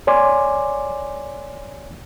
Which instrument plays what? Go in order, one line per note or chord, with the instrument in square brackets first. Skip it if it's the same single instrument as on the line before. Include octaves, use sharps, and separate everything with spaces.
[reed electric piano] C#5 D5 G#5 C6 D6